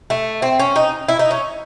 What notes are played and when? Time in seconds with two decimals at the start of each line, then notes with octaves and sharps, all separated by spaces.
0.10 A3
0.42 C4
0.59 C#4
0.76 D#4
1.09 E4
1.19 D#4
1.31 C#4